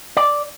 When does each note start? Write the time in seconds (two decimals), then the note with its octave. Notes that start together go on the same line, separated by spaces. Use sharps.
0.17 D5